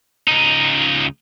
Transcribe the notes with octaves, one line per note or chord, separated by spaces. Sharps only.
C#2 D#4